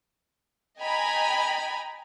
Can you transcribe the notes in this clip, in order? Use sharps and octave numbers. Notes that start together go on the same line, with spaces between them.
D#5 G5 G#5 A#5 B5